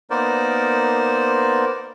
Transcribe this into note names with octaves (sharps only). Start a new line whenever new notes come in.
A#3 B3 D#4 A#4 C5 D5